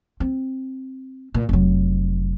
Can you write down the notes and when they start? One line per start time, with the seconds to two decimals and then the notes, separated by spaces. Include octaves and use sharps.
0.20 C4
1.34 A#2
1.49 F1 F#3